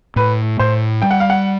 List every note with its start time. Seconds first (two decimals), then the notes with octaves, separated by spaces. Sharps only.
0.16 A2 B4
0.59 A2 C5
1.02 G3 G5
1.11 F#5
1.20 F5
1.30 F#5